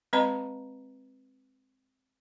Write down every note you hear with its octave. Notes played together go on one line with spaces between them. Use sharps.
G#3 C4 B4 D#5 A#5 B5